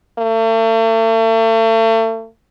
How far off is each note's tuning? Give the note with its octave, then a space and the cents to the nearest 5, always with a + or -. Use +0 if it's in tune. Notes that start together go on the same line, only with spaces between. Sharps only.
A3 +40